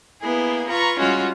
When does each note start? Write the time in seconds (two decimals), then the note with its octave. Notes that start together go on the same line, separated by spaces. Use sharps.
0.21 A#3 B3 E4 G#4
0.68 F4 B4 A#5 C#6
0.99 G3 G#3 C#4 F4 F#4